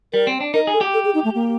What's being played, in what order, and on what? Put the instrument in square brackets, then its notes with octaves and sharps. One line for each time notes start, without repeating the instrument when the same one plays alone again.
[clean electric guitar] G3 [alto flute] A#4
[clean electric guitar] C4
D4
[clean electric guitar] D#4 [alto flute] A#4
[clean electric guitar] G#4
[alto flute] A4
[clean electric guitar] G4
[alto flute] A4
G#4
D#4
A3
A#3